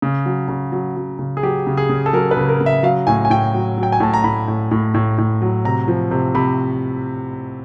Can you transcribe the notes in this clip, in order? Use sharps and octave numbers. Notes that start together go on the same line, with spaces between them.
C#3
F#3
C#3
F#3
F#3
C#3
G#4
F#3 G4
C#3
G#4
C#3
A4
F#3 A#4
B4
C#3
A#4
C#3
E5
F#3 F5
A2 G#5
G#5
A2 G5
F#3
F#3
G5
G#5
A2 A5
A#5
A2 B5
A2
A2
A2
A2
F#3
C3 A#5
F3
C3
C3 B5